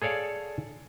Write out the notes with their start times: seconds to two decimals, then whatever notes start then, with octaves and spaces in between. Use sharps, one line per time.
0.02 G#4 A4 C#5 D5 F5